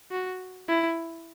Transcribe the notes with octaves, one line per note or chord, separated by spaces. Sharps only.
F#4
E4